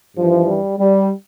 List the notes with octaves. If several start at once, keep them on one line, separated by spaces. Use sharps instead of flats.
G2 E3 F3
G3
G3